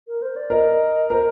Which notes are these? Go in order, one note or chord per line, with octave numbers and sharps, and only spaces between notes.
A#4
C5
D5
A#4 D#5
A#4 C5